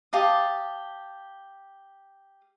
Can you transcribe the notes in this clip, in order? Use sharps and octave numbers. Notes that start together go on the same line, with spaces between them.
G4 F5 A5 D#6